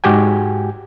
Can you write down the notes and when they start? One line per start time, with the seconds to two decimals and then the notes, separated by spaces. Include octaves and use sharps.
0.04 G#2 F#4 G4 G5 G#5